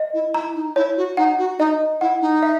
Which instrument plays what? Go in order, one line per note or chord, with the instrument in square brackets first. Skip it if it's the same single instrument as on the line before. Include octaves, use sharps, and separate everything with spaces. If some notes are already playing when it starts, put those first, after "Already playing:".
Already playing: [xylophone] D#5
[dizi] E4
[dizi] E4 [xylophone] A#5
[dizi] D#4
[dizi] E4 [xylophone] C#5
[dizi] F#4
[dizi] D#4 [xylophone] F#5
[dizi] F#4
[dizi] D#4 [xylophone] D#5
[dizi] E4 [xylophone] F#5
[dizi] D#4
[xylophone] E5